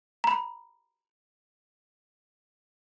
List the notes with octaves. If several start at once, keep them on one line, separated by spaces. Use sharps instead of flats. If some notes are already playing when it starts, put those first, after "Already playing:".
A#5 B5